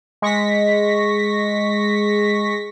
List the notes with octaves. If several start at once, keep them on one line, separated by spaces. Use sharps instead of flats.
G#3 C#6 A#6 B6